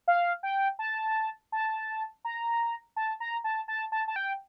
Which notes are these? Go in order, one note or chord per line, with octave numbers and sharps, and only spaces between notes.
F5
G5
A5
A5
A#5
A5
A#5
A5
A5
A5
A5
G5